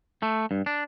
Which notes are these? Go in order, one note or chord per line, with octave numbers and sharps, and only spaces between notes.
A3
G2
D4